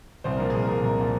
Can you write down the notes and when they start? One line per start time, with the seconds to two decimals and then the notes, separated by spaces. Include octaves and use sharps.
0.24 C2 C5
0.36 A#2 F3 A#4
0.50 C2 G#4
0.62 A#4
0.68 A#2 F3
0.83 C2 A#4
0.99 A#2 F3